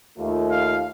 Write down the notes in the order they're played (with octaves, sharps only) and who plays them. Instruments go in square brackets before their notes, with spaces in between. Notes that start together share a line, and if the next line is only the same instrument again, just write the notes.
[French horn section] D#2 A3 F4
[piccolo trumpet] F5